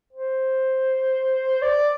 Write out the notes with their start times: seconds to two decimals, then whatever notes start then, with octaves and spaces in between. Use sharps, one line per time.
0.13 C5
1.62 D5